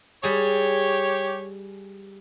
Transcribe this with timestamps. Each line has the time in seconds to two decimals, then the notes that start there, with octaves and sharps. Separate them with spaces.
0.23 G3 G4 G#4 C#5